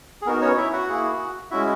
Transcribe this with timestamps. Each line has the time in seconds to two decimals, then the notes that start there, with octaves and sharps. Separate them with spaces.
0.22 G#4
0.26 B3 D#4 F#4 A#4
0.42 C#4 C#5
0.57 E4 E5
0.73 F#4 F#5
0.89 A#3 E4 G#4
1.51 G#3 C#4 E4 F#4 E5